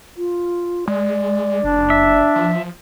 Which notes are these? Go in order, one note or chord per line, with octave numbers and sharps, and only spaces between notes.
F4
G#3 D5
F#1 D4
E5
F3